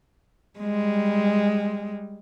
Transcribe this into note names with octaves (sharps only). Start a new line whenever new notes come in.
G3 G#3